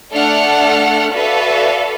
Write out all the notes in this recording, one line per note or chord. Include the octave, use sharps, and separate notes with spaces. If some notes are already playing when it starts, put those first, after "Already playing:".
A3 D4 A4 F#5 F6
F#4 A4 B4 D5 E5 F5